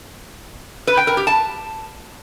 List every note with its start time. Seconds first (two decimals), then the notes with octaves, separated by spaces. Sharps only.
0.87 B4
0.97 G5
1.07 A#4
1.17 G4
1.27 A5